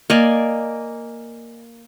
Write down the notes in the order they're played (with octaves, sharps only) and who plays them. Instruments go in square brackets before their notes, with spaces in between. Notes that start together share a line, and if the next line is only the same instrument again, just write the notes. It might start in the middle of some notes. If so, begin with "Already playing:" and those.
[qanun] A#3 D5 D#5 G#5